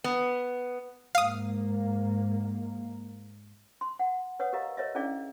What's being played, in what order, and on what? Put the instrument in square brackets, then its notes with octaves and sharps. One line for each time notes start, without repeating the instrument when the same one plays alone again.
[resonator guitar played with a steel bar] B3
[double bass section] G#2 A#3 [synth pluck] F5 D#6
[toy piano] C6
F#5
B4 C#5 F#5 D#6
G4 A#4 D#5 F5 A#5
A#4 C#5 D#5 E5
C#4 D4 E4 G#4 D5 F5